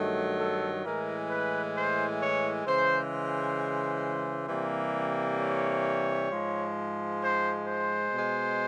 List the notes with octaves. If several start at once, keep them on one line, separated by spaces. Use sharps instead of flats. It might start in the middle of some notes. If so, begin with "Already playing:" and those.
Already playing: G2 D#3 F#3 A3
A4
A2 E3 G#3 A#4
B4
C5
C#5
C#3 E3 G#3 C5
C5
C3 E3 G3 A#3
C#5
G#2 F3 G#3
C5
C5
B2 G#3